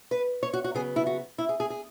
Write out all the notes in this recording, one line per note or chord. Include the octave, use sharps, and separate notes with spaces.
B4
C#5
F#4
F#4
C#3 F#3 B3 G#4
E4
F#4
E4
G#4
G#4
G#4